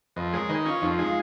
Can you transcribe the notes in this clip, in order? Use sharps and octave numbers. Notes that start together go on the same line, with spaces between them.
F2 B4 D#5
G#3 A#4 C#5
D#3 B4 D#5
C#4 F4
F2 D#4
F4
G#3 D#4
F4